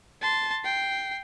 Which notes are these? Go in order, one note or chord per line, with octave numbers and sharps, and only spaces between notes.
A5 C6
G5 C7